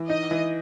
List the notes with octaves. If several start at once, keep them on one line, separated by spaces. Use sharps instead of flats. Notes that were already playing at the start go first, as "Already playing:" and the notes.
Already playing: E3
D#4 D#5
E3